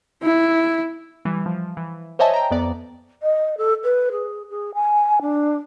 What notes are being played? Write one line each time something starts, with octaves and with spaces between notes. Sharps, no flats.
E4
E3 G3
F3
E3
C5 C#5 D#5 E5 G#5 A5
G5 A#5
F2 B3 D5
D#5
A4
B4
G#4
G#4
G#5
D4